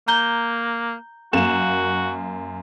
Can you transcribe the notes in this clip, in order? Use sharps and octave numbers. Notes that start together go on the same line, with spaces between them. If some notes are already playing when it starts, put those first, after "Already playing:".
A#3 A#5 G6 G7
F#2 A#3 F#4 E7